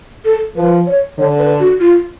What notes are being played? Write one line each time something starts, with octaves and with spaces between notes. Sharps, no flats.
A4
F3 B4
C#5
D3 C#5
B4
F#4
F4